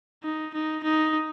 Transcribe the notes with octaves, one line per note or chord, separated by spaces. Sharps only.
D#4
D#4
D#4